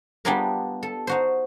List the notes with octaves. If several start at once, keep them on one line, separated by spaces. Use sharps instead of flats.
G3 B3 D4 F4 G#4 A#4
A4
D#4 F#4 C5